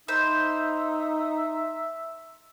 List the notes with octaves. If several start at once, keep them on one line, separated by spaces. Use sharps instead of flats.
D#4 C5 E5 B5